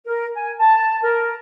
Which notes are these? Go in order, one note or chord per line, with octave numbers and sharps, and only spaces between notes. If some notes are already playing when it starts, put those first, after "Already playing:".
A#4
G#5
A5
A#4